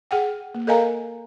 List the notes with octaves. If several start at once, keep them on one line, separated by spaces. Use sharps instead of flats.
G#4 F#5 G5
A#3
A4 A#4 D#5 F5 G#5 A#5